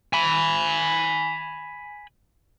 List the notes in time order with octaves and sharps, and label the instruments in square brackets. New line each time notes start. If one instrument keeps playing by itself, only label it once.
[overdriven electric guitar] G#5 B5